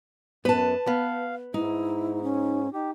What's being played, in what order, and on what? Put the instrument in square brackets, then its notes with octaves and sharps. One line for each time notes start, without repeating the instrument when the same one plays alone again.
[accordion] F#2 [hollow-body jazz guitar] B3 [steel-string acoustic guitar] B4 A5
[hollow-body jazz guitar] B3 [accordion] F5
[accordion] G#2 [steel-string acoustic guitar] D#4 [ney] E4
[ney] C#4
[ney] D#4 [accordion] G4